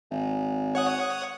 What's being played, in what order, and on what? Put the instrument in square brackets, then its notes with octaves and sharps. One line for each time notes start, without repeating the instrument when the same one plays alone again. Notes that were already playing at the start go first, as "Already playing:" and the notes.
[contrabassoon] G#1
[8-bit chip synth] C#5 F#5 D#6